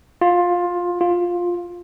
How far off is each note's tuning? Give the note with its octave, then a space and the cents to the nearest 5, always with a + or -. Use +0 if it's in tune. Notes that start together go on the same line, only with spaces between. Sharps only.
F4 +15
F4 +10